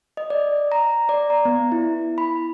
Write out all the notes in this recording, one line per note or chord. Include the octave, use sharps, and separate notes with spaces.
D#5
D5
A#5
D5
A#5
B3
E4
B5